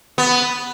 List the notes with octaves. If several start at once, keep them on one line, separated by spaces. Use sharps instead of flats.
B3